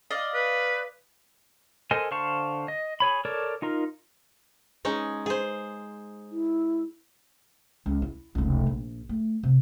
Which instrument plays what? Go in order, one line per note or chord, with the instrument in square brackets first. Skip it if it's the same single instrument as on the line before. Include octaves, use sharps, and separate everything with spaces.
[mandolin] D5 D#5 F5
[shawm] B4
[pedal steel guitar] A4 A#4 C5 D#5 G#5
D3 C5 F5 A5 C#6
D#5
G#4 C#5 B5
A4 A#4 C#5 D5
D#4 F4 A#4
[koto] G#3 C#4 D#4
G#4 C5
[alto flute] E4
[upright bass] C#2
E4
F1 C#2
A#1
A3
C3